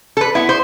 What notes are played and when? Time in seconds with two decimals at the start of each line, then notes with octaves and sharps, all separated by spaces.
0.17 A4
0.21 B4
0.35 B3 E4
0.49 C5